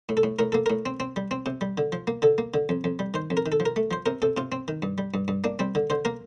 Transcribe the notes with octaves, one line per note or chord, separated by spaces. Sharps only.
A2
A4
A2
A2 A#4
A#3 A4
A2 A#4
C4
C4
G3
C4
C3
G3
D3
F3
A#3
D3 A4
A#3
D3
F2
F2
G3
D#3 C5
F2
A#4
D#3
A4
F3
A#4
A3
F3 C5
C3 A#4
C3 A4
C3 F4
C4
D#3
G2
G3
G2
G2
A#3 D4
G3 C4
D3
D3 C5
A#3 A#4